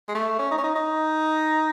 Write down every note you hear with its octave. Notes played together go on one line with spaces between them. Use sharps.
G#3
A3
C#4
D#4
C#4
D#4
D#4